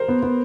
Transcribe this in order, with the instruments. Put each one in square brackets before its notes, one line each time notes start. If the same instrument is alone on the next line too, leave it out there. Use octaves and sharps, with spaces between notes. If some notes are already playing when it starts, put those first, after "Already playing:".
Already playing: [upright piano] A#4 C5
[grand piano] B3
B3